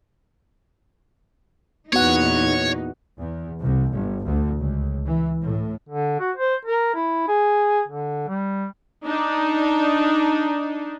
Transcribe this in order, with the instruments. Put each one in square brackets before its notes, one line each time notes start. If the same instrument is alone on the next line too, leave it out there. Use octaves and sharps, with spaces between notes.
[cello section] E2 A#2 D#4 [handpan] B3 F#4 F#5 [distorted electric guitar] C#5
[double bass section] E2
C2
G1
D2
C#2
E3
A2
[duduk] D3
F#4
C5
A#4
E4
G#4
D3
G3
[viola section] D4 D#4